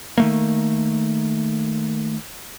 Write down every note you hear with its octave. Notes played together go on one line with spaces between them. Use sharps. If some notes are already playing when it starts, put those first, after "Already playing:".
D#3 A3 A#3